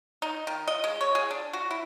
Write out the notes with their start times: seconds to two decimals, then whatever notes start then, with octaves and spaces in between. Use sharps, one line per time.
0.22 D#4
0.47 D#3
0.68 D#5
0.84 G#3
1.01 C#5
1.15 G#4
1.31 D4
1.53 F#4
1.71 E4